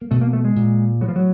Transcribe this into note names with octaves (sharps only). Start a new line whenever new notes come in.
A#3
B2 A3
A#3
A3
G#3
A#2
A2 F#3
F3
F#3